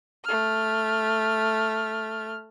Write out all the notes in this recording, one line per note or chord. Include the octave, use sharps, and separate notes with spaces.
A3 F6